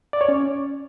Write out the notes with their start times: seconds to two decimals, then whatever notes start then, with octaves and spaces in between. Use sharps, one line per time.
0.13 D5
0.21 C#5
0.28 C#4